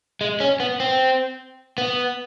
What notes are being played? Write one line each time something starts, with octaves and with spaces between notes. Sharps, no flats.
G#3
C#4
B3
C4
B3